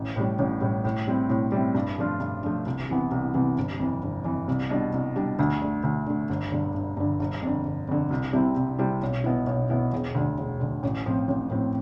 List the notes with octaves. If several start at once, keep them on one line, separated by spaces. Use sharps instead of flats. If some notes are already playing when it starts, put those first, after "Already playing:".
Already playing: A1
A2 G3
A1
A2 G3
A2
G3 C4 E4
A2
G3 C4 E4
G2
F3 A3 D4 F4
G2
F3 A3 D4 F4
C2
C3 E3 B3
C2
C3 E3 B3
G1
F2 E3
G1
F2 E3
C2
B2 G3 D4
C2
B2 G3 D4
D2
D3 A3
D2
D3 A3
G1
G2 D3
G1
G2 D3
G1
F2 D3
G1
F2 D3
C2
C3 G3 C4 E4
C2
C3 G3 C4 E4
B1
B2 B3 E4
B1
B2 B3 E4
E1
D2 D3
E1
D2 D3
A1
A2 F3 C4
A1
A2 F3 C4